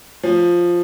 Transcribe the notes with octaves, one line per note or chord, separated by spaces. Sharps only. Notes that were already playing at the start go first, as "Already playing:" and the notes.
F3